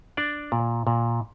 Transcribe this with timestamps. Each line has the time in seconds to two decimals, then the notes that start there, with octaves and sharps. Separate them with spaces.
0.17 D4 D5
0.52 A#2
0.87 A#2